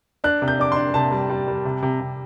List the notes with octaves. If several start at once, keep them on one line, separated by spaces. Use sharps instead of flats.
D4 F#6
C3
G6
D4 D6
D4 C6
C3 A5
G3
G3
G3
C3
C3
C3